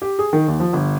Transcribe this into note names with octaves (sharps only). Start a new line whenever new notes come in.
G4
G#4
D#3
D#2
F3
G1